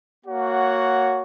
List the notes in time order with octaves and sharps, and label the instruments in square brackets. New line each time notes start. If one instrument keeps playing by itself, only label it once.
[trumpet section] A#3 F#4 C#5 F#5